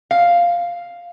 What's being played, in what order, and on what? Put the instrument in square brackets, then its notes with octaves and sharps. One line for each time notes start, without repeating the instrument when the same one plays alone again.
[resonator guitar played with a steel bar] F5